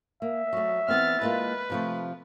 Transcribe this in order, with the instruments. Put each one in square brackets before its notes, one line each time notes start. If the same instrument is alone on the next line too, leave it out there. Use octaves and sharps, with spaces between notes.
[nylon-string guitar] A#3 [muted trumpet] E5
[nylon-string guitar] F#3 A3
[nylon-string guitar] E3 B3 C4 [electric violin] F6 A6
[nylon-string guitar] G#3 A#3 F4 [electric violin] B4
[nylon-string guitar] C3 F3 A3